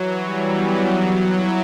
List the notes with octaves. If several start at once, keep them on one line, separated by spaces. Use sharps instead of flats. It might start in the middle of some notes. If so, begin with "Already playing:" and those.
Already playing: E3 F#3
G3
B3
F#3
E4